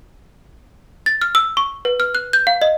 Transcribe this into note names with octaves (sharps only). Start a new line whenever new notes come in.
A6
F6
E6
C#6
B4
F6
F#6
G6
F5
D#5